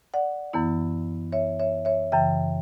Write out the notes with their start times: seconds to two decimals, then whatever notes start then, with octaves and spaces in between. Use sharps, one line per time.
0.14 D5 F#5
0.53 F#2 E3 B3 E4
1.32 C#5 E5
1.59 C#5 E5
1.85 C#5 E5
2.12 F#2 C#3 E3 E5 G5